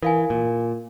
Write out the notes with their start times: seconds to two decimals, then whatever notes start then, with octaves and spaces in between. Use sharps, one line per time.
0.03 E3 A#4 F5 G#5
0.30 A#2